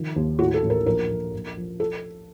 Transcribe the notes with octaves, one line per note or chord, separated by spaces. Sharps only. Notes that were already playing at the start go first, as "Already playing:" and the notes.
Already playing: D#3 F3
D#2
A2 F#4
A4
A1
A#4
A#1 A#4
A#1
A#1
F3
A4